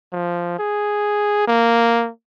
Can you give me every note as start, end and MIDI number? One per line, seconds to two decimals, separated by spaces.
0.12 0.54 53
0.59 1.48 68
1.48 2.09 58